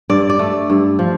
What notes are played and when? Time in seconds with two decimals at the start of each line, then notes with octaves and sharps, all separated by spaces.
0.10 G2 D5
0.30 D5
0.39 A3
0.70 G2
0.99 F3